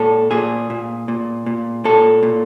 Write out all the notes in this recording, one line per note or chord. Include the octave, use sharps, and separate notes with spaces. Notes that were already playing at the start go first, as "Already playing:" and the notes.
Already playing: A#2 A4
A#2 G#4
A#2
A#2
A#2
A#2 A4
A#2